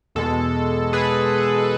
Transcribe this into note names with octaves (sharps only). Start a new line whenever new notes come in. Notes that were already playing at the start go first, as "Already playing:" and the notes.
E2 B2 G#3 A4
G#4 B4